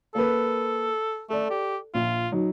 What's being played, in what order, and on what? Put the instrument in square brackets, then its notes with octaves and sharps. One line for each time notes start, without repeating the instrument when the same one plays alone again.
[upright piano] A#3 B4 [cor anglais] A4
[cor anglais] A3 [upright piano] A4 D5
[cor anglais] G4
[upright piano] A#1 [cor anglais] F4
[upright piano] F#3 D#4